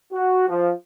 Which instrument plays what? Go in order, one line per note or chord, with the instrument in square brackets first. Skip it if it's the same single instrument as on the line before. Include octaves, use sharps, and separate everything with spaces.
[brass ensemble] F#4
F3